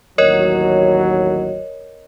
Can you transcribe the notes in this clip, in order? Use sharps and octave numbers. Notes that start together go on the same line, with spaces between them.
A1 D#2 F#3 A#4 C#5 D#5